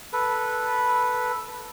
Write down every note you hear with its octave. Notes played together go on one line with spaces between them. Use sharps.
A4 B4